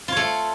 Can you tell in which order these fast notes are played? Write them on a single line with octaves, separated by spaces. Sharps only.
F4 C#5 A3